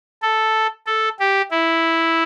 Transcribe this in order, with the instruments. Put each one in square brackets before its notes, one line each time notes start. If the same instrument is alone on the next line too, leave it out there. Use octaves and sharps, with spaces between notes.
[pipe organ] A4
A4
G4
E4